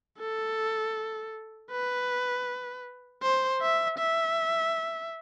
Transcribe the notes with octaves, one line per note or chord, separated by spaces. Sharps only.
A4
B4
C5
E5
E5